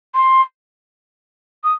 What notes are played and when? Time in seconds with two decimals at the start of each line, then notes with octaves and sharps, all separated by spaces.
0.14 C6
1.64 D#6